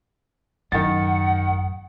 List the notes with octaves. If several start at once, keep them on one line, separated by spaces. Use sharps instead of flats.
A1 F#2 D#3 F#5 A6